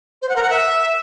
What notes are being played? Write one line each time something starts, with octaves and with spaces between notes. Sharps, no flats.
C5
F#5
A#4
F#5
E5